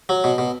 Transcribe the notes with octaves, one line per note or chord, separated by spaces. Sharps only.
F#3
B2
B2